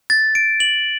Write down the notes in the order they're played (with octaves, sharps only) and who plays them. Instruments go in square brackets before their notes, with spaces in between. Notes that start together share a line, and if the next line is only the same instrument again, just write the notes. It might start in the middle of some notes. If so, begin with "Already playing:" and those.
[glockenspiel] A6
D7
F#7